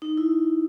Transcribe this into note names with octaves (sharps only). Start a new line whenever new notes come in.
D#4
E4